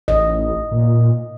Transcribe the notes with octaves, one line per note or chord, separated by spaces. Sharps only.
A1 D#5
A#2